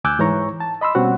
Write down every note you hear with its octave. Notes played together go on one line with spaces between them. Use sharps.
D2 G#5 D6 E6 F#6 G6
G#2 E3 C#5 A#5 C#6
A5
D#5 B5 C6 E6
B2 G3 C4 C#4 F#4 F#5